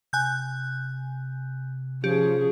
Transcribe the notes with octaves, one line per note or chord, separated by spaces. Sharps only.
C3 G#5 F#6 G6
F3 C#4 G4 G#4